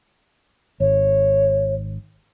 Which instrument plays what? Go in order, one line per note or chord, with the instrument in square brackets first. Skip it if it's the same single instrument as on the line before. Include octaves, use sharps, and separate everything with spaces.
[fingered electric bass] G#1 [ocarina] C#5